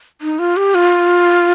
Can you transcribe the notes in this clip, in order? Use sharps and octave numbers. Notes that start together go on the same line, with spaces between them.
D#4
F4
G4
F4